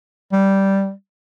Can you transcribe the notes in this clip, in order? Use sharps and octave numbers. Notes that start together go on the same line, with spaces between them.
G3